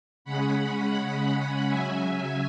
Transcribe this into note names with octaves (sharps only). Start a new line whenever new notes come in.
C#3 G#3 C#4 F#5 B5
C#3 F#3 C#4 E5 G#5